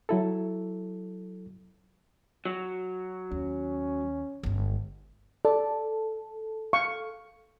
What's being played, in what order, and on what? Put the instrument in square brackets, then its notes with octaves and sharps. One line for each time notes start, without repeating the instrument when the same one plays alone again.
[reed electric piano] F#3 E4 A4
[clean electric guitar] F#3
[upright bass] D#2 [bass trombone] C#4
[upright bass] G1 G#3
[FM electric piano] A4 [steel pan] D5
[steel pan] F5 C#6